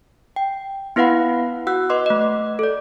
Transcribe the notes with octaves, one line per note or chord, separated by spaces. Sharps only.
G5
B3 E4 B4 F5 F#5 B5
F#4 F#5 E6 F#6
B4 D#5 C6 D6
A3 D#5
A4 D5